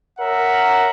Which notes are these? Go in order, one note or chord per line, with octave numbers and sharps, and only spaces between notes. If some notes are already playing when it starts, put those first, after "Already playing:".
A#4 C#5 E5 F#5